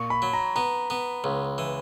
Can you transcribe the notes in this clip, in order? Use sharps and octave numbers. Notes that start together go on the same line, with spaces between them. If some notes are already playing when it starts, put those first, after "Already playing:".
Already playing: A#2 C#6
B5
F#3
A#5
B3 A#5
B3
C#2
E3